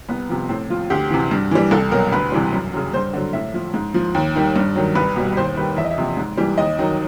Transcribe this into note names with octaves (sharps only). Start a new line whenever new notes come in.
C2 B3
C3 F3
A2 C4
F3 F4
D2 G4
C3 E3
G2
E3 G3
C2 A4
B2 F#3 A#4
D2 B4
C3 E3 G3
F#2
C#3 F#3
G2 C5
D3 F#3
A2 E5
F3
G#2
F3
D#2
D#3 G3
G2
D#3 F#3
C2 B4
B2 G3
D#2 C5
D#3 G3 B4
E2 E5
D#5
E5
C3 F3
G#2
E3 G3
D#2 D#5
D#3 F#3